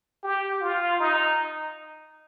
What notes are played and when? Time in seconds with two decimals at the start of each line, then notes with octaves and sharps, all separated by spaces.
0.23 G4
0.61 F4
1.00 D#4